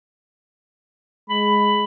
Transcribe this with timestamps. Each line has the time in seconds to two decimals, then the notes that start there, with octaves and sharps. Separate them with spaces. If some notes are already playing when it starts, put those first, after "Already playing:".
1.30 G#3 B5